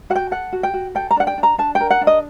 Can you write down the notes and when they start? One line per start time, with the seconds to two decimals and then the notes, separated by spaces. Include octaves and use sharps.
0.10 F#4 F#5
0.15 G5
0.31 A4 F#5
0.52 F#4
0.63 G5
0.74 F#4
0.95 A4 G5
1.11 A#5
1.17 D4 F#5
1.27 G5
1.38 D4
1.43 A#5
1.58 D4 A5
1.75 G5
1.80 A#4
1.90 F#5
2.01 D4
2.07 D#5